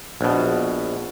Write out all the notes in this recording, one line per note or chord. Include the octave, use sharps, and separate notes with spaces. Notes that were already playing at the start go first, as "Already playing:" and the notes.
A#1 B2